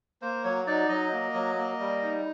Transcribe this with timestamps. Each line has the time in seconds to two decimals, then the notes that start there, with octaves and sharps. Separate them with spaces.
0.22 A#3 C5
0.44 F#3 C#5
0.67 D#4 D5
0.89 F#3 D#5
1.12 A#3
1.34 F#3
1.58 A#3
1.80 G3
2.03 D#4